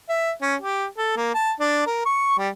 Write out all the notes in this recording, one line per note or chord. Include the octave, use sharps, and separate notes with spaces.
E5
C#4
G4
A4
A#3
A5
D4
A#4
C#6
G3